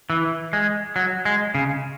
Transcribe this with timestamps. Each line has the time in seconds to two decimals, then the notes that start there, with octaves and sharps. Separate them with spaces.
0.10 E3
0.53 G#3
0.96 F#3
1.25 G#3
1.55 C#3